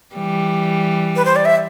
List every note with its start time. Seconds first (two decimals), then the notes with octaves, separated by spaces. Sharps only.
0.15 E3 G3
1.16 B4
1.25 C5
1.36 D5
1.45 E5